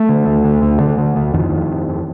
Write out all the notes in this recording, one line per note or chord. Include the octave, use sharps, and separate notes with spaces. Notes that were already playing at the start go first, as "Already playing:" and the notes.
Already playing: A3
D3
D2
D2
D2
D3
D3
D2
F2 D#3
F2
F2
F2